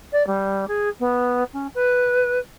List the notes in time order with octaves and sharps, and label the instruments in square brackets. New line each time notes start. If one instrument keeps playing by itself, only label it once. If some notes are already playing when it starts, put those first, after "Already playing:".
[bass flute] D5
G3
G#4
B3
C#4
B4